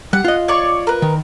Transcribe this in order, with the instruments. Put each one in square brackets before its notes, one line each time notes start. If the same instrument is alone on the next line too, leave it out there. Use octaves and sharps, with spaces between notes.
[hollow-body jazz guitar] G3 [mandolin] F#5
[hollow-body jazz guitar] F4 D#5
[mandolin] C#5 D5 C#6
A#4 B4
[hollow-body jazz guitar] D#3